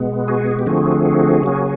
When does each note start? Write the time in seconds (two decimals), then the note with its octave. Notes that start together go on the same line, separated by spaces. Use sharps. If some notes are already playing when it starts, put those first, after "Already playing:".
Already playing: B2 G#3 B3
0.28 F#4 G#4
0.51 F#4
0.59 G4
0.67 D3 F3 A3 C4 F#4 G#4
1.43 C#3 F#3 A#3 C#4